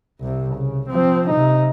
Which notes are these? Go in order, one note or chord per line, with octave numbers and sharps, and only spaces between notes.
C2 C3
C#3
F3 C4
C3 D#4